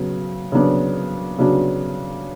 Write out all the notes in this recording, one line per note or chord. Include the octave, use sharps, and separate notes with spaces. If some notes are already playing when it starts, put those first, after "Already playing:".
Already playing: C#3 F#3 B3 F#4
C#3 F#3 B3 D4 F#4
C#3 F#3 B3 D4 F#4